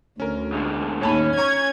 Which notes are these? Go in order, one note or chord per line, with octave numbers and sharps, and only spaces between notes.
D2 C#4 A#4
G#2 D3
D#2 A2 C#4 A5 B5
C#5 A#5 C#6 G#6